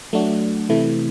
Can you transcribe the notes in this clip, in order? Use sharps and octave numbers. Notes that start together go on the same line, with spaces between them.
F#3 A3 D4 F#4
C3 E3 A3 E4